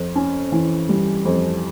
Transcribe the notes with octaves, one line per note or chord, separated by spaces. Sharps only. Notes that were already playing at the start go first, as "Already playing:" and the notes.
Already playing: F2
C#4
E3
G3
F2